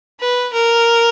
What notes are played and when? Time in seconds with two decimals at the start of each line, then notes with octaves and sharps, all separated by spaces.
0.20 B4
0.53 A#4